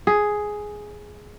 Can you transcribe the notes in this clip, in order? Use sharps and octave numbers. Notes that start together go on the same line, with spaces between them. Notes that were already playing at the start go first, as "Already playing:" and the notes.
G#4